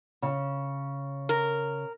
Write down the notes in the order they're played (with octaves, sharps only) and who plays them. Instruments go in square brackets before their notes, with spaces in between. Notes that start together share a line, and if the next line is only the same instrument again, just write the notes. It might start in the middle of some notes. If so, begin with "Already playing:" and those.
[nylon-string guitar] C#3
[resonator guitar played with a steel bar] A#4